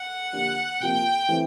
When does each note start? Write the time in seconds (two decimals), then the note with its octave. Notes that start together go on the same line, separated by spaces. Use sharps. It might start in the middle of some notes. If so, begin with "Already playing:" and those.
Already playing: F#5
0.33 D3 F3 A#3 D4 G4
0.80 C3 F3 A#3 G5
1.29 E3 A3 C4